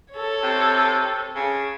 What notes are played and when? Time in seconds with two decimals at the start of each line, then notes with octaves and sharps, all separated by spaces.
0.13 A4 C#5
0.43 C3
1.36 C#3